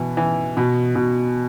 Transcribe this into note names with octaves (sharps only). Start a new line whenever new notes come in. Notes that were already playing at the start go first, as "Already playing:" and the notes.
Already playing: B2 E3
E3
B2
B2